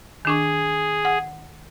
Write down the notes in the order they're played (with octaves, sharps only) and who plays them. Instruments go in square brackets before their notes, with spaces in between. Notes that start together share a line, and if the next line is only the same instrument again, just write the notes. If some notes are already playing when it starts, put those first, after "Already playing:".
[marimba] D#3 D4 C#6 [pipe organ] G#4
[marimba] F#5